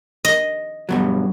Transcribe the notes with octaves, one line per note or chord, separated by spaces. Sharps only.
D#5
G2 B2 F#3